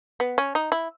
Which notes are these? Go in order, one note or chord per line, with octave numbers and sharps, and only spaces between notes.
B3
C#4
D#4
E4